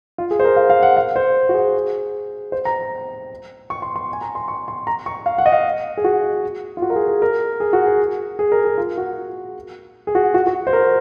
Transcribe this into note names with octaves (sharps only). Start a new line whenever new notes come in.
F4
G#4
C5
A#4
F5
F5
F#5
F5
C5
F#4
G#4
C5
A#5
C#6
C6
C6
G#5
A#5
C6
C#6
C6
A#5
C#6
F5
F#5
D#5
F5
G#4
F#4
F4
F#4
A#4
G#4
G#4
A#4
G#4
F#4
G#4
G#4
A#4
G#4
F4
F#4
G#4
F#4
F#4
F#4
C5
A#4